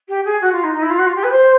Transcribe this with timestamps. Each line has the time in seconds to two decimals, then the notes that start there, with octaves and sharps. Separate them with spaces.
0.08 G4
0.25 G#4
0.41 F#4
0.52 F4
0.63 D#4
0.73 D#4
0.82 E4
0.90 F4
0.98 F#4
1.06 F4
1.15 G4
1.23 B4
1.31 C5